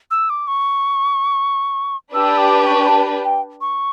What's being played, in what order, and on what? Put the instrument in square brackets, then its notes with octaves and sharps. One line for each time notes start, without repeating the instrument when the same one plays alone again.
[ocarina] E6
D6
C#6
[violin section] D4 G4 B4 [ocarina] E6
[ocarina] D6
D6
C#6
A5
G5
C#6